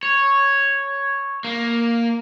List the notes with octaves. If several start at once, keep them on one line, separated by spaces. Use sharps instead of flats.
C#5
A#3